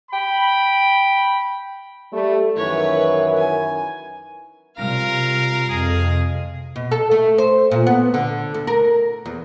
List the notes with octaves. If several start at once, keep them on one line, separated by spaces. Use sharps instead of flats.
G5 B5
G3 A3
F#2 D#3 E3 B4 C#5
G#5
C3 G3 F4 A#4 F5 A#6
F2 C3 G#4
B2
A4
A3
C5
A#2
B3
D3
D2
A#4
E2